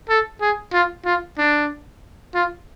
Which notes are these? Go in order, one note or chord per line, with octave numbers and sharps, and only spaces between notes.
A4
G#4
F4
F4
D4
F4